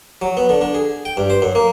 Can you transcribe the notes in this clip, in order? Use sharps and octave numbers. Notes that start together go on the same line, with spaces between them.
F#3
B3
D3
D3
G#4
G5
G2
C5
F#2
A#3